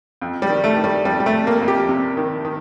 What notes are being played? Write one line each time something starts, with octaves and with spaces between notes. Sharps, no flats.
F2
G3
D#3
A3
D#3
G3
F2 G3
G3
A3
C3
A#3
F2
G4
C3
D#3
D#3